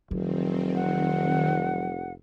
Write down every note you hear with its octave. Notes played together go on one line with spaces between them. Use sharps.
F1 D#3 F#3 C4
F#5